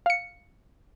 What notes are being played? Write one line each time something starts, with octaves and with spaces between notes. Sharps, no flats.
F5 C#7